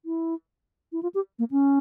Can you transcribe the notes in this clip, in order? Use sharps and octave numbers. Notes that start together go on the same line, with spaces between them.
E4
E4
F4
G4
A#3
C#4